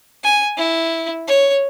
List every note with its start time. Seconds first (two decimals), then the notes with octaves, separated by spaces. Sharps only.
0.24 G#5
0.58 E4
1.28 C#5